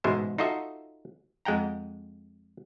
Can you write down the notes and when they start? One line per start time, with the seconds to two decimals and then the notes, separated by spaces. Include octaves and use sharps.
0.04 A1 G#2 B2 G#3 C5 E5
0.38 D#4 F4 F#4 A4 D#5 E5
1.45 F2 G#3 F#5 G5 A#5